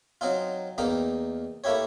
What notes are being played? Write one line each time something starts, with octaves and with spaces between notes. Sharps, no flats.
F#3 C4 D#4 F4
E2 A#3 D#4 G5 D6
A3 A#3 E4 G4 C#5